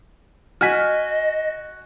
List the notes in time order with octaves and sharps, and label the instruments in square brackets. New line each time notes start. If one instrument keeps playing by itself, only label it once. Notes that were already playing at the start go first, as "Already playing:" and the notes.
[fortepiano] F#4 G#5 [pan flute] D#5 [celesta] F6 B6